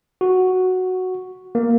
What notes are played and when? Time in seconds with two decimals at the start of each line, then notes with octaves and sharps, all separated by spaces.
0.21 F#4
1.55 A#3